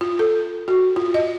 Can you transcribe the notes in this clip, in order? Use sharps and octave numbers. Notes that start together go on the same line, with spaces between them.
F4
A4
F#4
F4
D#5